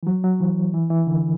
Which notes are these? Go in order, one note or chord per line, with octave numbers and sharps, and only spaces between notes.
E3
F#3
F#3
E3
E3
E3
D3